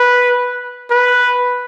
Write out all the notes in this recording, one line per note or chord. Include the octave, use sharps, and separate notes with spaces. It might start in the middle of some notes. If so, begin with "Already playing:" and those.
Already playing: B4
B4